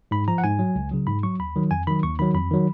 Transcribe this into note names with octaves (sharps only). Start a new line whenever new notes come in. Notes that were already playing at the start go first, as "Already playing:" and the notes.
G#2 B5
F3 A#5
F#5
G#2 G#5
F#3
C#2
C#3 F#3
G#2 B5
F#3 C#6
D#2 B5
D#3 F#3
F2 G#5
D#3 F#3 B5
D#2 C#6
D#3 F#3 B5
F2 B5
D#3 F#3